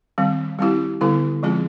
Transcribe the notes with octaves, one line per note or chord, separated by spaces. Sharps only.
D#3 G3 C4
G3 C4 E4 G4
D3 G3 B3 E4 A4
F3 G#3 C4 F4 G#4